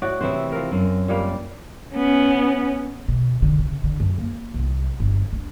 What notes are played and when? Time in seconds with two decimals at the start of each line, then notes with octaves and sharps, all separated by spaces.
0.02 A2 F#4 D5
0.21 A2 C3 E3 E4 C5
0.52 F3 A#4
0.71 F#2 C4
1.08 A#2 G3 A#3
1.95 B3 C#4
3.08 B2
3.42 D3
3.59 C#3
3.84 D3
4.00 F#2
4.18 A#3
4.54 C2
5.00 G1
5.33 D4